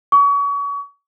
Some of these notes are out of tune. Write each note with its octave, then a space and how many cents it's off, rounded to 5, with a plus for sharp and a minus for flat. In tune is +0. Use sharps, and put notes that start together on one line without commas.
C#6 +35